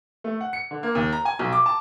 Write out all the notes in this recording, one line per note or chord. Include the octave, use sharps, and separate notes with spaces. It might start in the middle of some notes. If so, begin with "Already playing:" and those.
A3
F#5
C#7
D3
A#3
D#2
A#5
G#5
B1
D6
A5